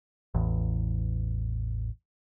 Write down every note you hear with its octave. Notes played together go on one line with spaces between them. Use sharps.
A1 E2